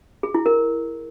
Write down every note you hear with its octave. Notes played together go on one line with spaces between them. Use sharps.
G#4
E4
A#4